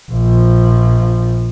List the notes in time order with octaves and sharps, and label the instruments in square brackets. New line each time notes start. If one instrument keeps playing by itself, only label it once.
[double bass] A#1 F3